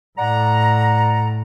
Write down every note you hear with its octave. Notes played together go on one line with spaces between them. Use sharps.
A2 D5 F#5 A#5